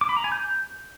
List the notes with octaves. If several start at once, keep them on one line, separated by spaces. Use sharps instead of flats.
D6
B5
A#5
G#5
G6